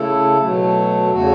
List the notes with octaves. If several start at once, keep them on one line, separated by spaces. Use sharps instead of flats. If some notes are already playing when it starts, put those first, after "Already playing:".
Already playing: C#3 A3 E4 A4
B2 F#3 A3
E2 C#3 A3 F#4